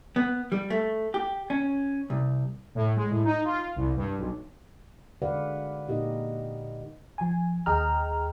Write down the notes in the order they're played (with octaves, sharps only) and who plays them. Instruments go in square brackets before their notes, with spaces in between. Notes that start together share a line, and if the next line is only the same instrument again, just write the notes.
[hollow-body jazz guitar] B3
G3
A3
G4
C#4
C2
[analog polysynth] A2
G#3
A2
D#4
F4
C2
G2
B1
[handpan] D3 G#3 B4 D5 F5 F#5
A#2 D#4 G4 A#4 D#5
[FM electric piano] F3 G#5
D#2 G#4 D#5 G5 A#5 F6